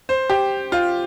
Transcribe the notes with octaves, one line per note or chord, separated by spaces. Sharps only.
C5
G4
F4